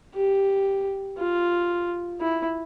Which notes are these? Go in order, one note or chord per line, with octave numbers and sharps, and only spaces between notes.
G4
F4
E4